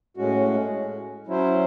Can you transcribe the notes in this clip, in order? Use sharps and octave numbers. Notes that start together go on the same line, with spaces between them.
A2 G#3 C#4 F#4
F#3 C#4 E4 C5